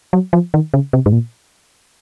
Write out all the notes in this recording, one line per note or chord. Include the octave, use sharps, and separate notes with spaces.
F#3
F3
D#3
C#3
C3
G#2
A#2